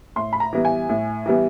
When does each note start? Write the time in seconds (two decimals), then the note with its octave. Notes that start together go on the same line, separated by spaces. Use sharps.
0.16 A2 C6
0.33 B5
0.40 A#5
0.53 E3 G3 B3
0.65 G#5
0.89 A2
1.26 E3 G3 B3